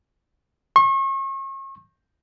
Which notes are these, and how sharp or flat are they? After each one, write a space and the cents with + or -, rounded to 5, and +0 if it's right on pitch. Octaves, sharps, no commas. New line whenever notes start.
C#6 -40